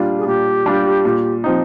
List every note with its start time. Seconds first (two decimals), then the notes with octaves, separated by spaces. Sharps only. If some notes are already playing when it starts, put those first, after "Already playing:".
Already playing: A#2 G3 D4 F4
0.18 G#4
0.26 A#2 G4
0.66 G3 D4 F4
1.05 A#2
1.44 F3 C4 D#4